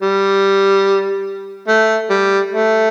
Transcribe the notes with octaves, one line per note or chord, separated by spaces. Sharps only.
G3
A3
G3
A3